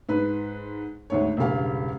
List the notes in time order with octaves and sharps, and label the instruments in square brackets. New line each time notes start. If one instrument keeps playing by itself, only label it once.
[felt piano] G#2 B4
D2 G#2 C#5
E1 G2 C#3 G4 F5